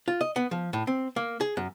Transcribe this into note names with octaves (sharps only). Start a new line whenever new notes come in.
F4
D#5
B3
F3
A2
C4
A#3
G#4
F#2